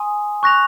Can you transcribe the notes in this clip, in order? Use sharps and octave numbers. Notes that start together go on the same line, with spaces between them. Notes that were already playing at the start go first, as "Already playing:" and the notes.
Already playing: G#5 C6 D#6
C#6 F#6 A#6 F7